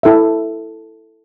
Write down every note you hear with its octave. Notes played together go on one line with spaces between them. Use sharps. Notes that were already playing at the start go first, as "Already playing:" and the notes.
E4 A4 E5